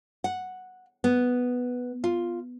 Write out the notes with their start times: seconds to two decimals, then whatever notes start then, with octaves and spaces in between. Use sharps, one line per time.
0.24 F#5
1.04 B3
2.04 F4